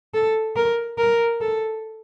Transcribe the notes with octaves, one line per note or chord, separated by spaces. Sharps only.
A4
A#4
A#4
A4